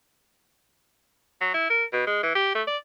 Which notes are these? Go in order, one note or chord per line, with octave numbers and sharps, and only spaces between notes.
F#3
E4
A#4
B2
G#3
E3
G4
A3
D5